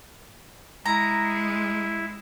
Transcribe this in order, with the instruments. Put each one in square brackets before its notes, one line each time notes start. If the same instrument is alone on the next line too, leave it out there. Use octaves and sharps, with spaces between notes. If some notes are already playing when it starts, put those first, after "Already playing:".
[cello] G#3 [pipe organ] E4 [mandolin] A#5